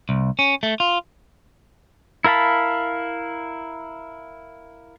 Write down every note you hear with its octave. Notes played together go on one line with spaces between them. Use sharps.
C2
C#4
A3
F4
E4 A#4 F5 A5 B5